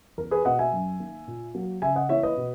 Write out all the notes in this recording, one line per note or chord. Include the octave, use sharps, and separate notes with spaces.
E2 A#4
G#4 B4
B2 A#3 D#5 F#5
E5 G#5
F#2
D#3 A#3
A#2
F#3 A#3
C#3 E5 G#5
D#5 F#5
E3 A#3 C#5 E5
B4 D#5
B2